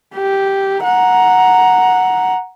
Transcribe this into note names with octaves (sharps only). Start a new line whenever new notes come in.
G4
F#5 A#5